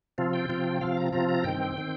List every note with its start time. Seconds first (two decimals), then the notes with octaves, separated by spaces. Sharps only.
0.18 C3 F3 C4 F4
0.33 G5
0.49 C3 F3 C4 F4
0.81 C3 F3 C4 F4 F5
0.97 A#5
1.13 C3 F3 C4 F4 A#5
1.29 A#5
1.44 G2 D#3 C4 G5
1.78 D#3 C4